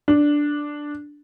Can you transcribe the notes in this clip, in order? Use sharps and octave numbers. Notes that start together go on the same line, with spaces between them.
D4